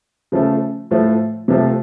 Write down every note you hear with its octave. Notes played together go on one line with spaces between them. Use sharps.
C#3 F3 A3
A2 F3 A3
C3 F3 A3